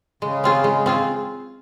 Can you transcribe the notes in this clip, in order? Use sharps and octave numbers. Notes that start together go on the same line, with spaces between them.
C#3 G#3
C4 F4 G#4
G#3
C4 F4 G#4